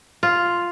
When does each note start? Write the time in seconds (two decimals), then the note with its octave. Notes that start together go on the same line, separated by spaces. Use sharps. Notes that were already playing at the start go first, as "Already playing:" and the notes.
0.23 F4